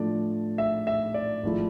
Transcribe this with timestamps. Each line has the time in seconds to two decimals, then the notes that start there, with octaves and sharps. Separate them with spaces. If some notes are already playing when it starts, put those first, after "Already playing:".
Already playing: A2 F3 A3 D4 D5
0.58 E5
0.87 E5
1.14 D5
1.43 G#1 G#2 F3 A3 E4